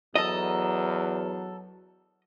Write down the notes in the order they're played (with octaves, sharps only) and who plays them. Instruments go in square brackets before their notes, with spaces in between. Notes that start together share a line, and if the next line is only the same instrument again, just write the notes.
[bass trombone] E2 [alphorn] F#3 [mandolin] A4 A#5 [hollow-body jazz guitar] D#5